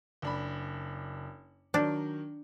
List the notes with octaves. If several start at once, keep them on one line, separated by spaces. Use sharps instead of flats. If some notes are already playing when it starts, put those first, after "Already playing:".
F#1 D4 B5
D#3 F#3 D4